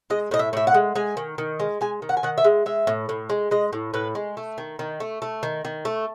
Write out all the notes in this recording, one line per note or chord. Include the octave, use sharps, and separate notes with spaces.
G#3 D#5
A2 D#5
E5
A2 E5
F#5
G#3
G#3 G#5
D#3
D#3
G#3
G#3 G#5
D#3
F#5
G#5
D#3 F#5
E5
G#3
G#3 E5
A2
A2
G#3
G#3 D#5
A2
A2 B4
G#3
A3
D#3
D#3
A3
A3
D#3
D#3
A3